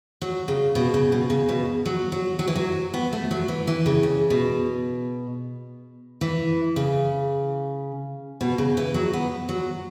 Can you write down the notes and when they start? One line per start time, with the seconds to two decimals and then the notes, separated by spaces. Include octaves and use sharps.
0.22 F#3
0.48 C#3
0.75 B2
0.94 C#3
1.12 B2
1.30 C#3
1.49 B2
1.86 F#3
2.12 F#3
2.39 F#3
2.48 E3
2.56 F#3
2.94 B3
3.13 A3
3.31 F#3
3.48 E3
3.67 E3
3.86 C#3
4.03 C#3
4.30 B2
6.21 E3
6.76 C#3
8.41 B2
8.58 C#3
8.77 E3
8.94 F#3
9.13 B3
9.49 F#3